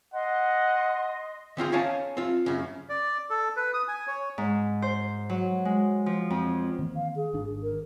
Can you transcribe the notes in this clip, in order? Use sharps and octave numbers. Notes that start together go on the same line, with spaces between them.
D#5 F#5 C6
D3 C4 F4 G#4
C#4 D#4 C#5 F5 G#5 A5
C4 F4
F#2 C#3
D5
A4
B4
D#6
G#5
C#5
G#2
C5
F#3
G#3
F3
F2
D#3 E3 A#3 C4
F5
G#4
G#1 D#3 D4
A#4